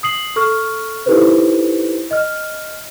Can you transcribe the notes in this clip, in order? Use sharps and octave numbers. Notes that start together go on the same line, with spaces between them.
D#6 C7 F#7
A4 C#6 F6
D#4 E4 G4 A4 B4 C5
D#5 F6